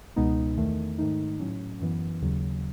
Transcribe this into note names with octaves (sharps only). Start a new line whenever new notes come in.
C#2 B2 G#3 B3 D#4
E2 D#3 A3
G#2 D#3 A3 D#4
A2 F#3 C#4
F#2 E3 B3
D#2 C#3 F#3